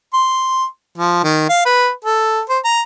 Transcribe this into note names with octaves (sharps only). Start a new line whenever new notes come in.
C6
F3
D#3
F5
B4
A4
C5
A#5